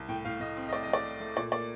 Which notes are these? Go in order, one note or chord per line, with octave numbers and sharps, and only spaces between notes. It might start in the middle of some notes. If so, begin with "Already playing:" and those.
Already playing: C2
A2 G5
A2 F5
A2 D#5
C4
D#5
A3 D5
D#5
A3 D5
A3
A3
A#2 D5
A#3 D5